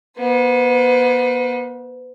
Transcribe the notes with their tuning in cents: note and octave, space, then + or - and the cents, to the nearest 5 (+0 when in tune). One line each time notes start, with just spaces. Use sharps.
B3 -40 B4 +40